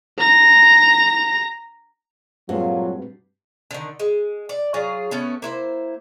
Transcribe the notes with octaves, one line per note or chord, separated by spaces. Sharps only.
A#5 A#6
G2 A#2 F#3 G#3 A#3 C4 F4 F#4
D3 D#3
G#3
D5
F#3 F4 G#4
A3 B3 C#4
A#3 E4 C5